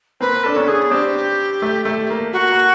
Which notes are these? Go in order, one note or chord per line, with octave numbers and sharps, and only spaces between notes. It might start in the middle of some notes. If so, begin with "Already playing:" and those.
A#3 C4 B4
D4 A4
B3 C#4
G#4
C4 D4 G4
A3
A3
A#3
A#3 F#4
A#3